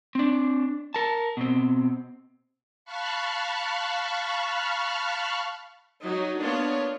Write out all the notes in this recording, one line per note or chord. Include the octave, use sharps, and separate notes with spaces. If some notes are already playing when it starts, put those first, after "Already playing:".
C4 D4
A#4 A5
B2 C4
F5 A5 B5 C#6 F6 F#6
F#3 D#4
A#3 B3 D4 F4 C#5